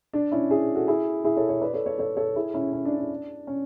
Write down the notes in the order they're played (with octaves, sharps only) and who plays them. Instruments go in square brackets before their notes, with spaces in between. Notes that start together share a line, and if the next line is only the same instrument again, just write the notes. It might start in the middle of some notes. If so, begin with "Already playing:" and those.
[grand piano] D4
C#4 E4
E4 G#4
F#4 A4
E4 G#4
E4 G#4
A4 C#5
A4 C#5
B4 D5
A4 C#5
A4 C#5
A4 C#5
A4 C#5
E4 G#4
C#4 E4
C#4
D4
D4
C#4